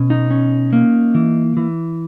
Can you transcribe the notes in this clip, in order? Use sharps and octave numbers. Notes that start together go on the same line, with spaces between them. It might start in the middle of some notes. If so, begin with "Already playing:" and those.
Already playing: B2 C#4
D#4
C#4
A#3
E3
E3